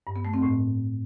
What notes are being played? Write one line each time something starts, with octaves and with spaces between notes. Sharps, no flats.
G2
B3
A3
C4
A2